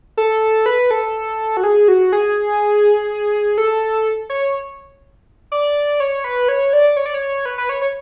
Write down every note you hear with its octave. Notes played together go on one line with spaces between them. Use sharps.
A4
B4
A4
F#4
G#4
F#4
G#4
A4
C#5
D5
C#5
B4
C#5
D5
C#5
D5
C#5
B4
B4
C#5
C#5